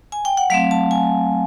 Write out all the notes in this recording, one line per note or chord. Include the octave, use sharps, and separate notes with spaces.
G#5
G5
F#5
F#3 A3 C4 F5
A5
G#5